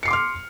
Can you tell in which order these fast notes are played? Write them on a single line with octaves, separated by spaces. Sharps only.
C#7 C7 D6 C6 F6